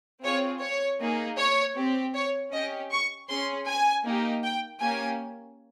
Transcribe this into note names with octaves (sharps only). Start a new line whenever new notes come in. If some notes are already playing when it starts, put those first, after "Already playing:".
C4 F4 G#4 C#5
C#5
A#3 D#4 G#4
C#5
C4 G4
C#5
C#4 G4 D#5
C#6
C#4 G#4 C6
G#5
A#3 D#4 G4
G5
A#3 C#4 G4 G#5